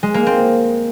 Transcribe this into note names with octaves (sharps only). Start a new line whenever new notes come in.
G#3
A#3
C4